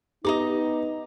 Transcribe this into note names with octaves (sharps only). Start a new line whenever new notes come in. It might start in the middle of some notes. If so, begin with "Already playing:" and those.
B3 D#4 G4 D#5 A#5 D6